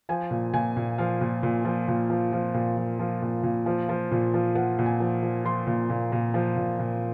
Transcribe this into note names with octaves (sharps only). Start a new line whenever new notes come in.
F3 G#5
A#2
A#2 G#5
A#2
F3 F5
A#2
A#2
F3
A#2
F3
F3
A#2
F3
F3
A#2
A#2
F3
F3
A#2
F3
F3 F#5
A#2
G#5
F3
F3
F3 C6
A#2
A#2
A#2
F3
A#2
A#2